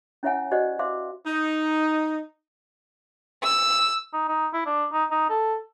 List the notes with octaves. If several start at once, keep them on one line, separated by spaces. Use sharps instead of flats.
C#4 E4 C#5 E5 F#5 G#5
F#4 G4 C5 D5 D#5 F#5
C5 E5 F5 C6 D6
D#4
E6
D#4
D#4
E4
D4
D#4
D#4
A4